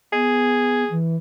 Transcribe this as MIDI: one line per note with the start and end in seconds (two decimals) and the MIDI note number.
0.13 0.84 59
0.13 0.96 68
0.90 1.16 52